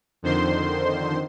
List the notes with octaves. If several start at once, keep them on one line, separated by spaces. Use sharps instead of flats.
F2 D3 D#3 C5 C6